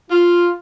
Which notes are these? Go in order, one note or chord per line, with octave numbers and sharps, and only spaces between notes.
F4